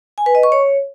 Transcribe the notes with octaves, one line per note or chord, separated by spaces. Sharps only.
G#5
B4
D#5
C#6
C#5